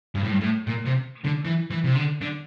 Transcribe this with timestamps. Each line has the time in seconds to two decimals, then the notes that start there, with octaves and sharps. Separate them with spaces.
0.15 G2
0.24 A2
0.31 G2
0.41 A2
0.67 A#2
0.86 C3
1.25 D3
1.45 E3
1.71 E3
1.85 C3
1.96 D3
2.21 D3